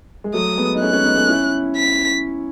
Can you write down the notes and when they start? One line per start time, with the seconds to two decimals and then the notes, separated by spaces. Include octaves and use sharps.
0.24 G#3
0.34 F#3 A3 D#6
0.57 G#3 B3
0.74 D#4
0.81 A3 C#4 F#6
0.92 A3 C#4
1.04 B3 D#4
1.17 A3 C#4
1.28 C#4 E4
1.76 B6